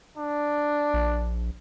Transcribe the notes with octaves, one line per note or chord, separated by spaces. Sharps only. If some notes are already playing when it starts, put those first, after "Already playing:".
D4
A#1